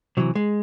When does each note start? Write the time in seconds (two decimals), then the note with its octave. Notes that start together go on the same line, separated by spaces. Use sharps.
0.17 C3 E3 F#3
0.35 G#3